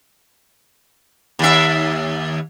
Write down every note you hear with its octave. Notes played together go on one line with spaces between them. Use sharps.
D#2 E5